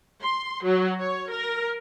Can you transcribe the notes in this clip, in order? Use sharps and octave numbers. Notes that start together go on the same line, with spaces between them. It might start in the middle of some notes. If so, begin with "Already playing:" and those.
C6
F#3
C#5
A#4